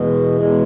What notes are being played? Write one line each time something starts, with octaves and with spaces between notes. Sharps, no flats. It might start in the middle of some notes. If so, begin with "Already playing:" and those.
Already playing: E2 B2 G#3
E2 B2 G#3